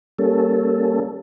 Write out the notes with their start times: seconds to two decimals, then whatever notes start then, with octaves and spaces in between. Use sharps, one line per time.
0.19 G3 A#3 C#4 A4